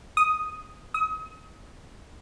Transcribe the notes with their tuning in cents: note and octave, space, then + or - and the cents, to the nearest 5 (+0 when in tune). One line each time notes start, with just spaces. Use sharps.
D#6 +0
D#6 +35